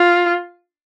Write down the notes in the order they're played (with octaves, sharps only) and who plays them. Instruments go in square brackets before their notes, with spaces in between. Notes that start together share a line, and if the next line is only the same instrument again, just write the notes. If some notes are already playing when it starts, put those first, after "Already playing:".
Already playing: [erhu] F4